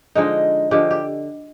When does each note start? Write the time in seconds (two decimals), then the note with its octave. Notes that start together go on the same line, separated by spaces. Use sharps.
0.15 D3 F3 G#3 D#4
0.71 D3 F3 G#3 G4
0.91 G4